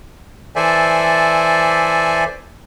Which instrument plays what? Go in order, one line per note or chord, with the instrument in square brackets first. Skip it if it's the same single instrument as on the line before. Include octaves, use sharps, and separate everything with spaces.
[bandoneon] E3 A4 C5 D5 E5 G#5